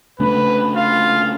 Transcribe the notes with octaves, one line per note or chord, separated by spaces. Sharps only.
C#3 A3 D4 B4
F4 F5